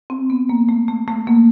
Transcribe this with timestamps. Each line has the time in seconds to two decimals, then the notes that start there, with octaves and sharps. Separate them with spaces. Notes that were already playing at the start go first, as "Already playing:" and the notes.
0.10 C4
0.30 B3
0.49 A#3
0.69 A3
0.88 A3
1.08 A3
1.27 A#3